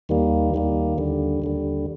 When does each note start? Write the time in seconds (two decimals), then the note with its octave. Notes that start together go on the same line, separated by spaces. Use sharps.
0.09 D#2 D#3 G3 A#3
0.54 D#2 D#3 G3 A#3
0.98 D#2 D3 G3
1.42 D#2 D3 G3